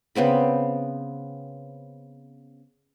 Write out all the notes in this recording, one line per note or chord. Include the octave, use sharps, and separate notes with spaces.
C#3 B3 C4 B5